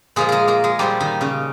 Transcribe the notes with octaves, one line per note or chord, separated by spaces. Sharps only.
A#2 F3 G#3 A#3 G#4
G#3 G#4 A#4
A#3 A#4
G#3 G#4
A#2 F3 G3 A#3 G4
D#3 D#4
C#3 C#4